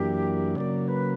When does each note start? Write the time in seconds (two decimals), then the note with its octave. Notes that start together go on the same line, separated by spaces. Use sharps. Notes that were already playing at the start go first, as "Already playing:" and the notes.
Already playing: F#2 E3 A#3 D4 G4
0.55 C#3 F#3 A#3 D5
0.87 B4